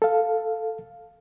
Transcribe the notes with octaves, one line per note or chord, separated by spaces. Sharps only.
A4 F5